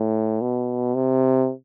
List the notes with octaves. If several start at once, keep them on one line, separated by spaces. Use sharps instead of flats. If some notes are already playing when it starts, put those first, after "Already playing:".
Already playing: A2
B2
C3